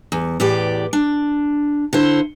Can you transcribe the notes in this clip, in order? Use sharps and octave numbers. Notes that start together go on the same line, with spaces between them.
E2
E2 A2 G4 B4 D5
D4
D3 E4 C5